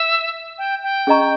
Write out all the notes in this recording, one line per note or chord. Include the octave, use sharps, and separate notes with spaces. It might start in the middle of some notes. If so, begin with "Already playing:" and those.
Already playing: E5
G5
G5
C#4 G#4 D#5 A#5 C#6